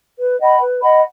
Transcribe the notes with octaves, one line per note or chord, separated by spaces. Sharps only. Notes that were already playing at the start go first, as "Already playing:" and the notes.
B4
D#5 F#5 B5
B4
D#5 F#5 B5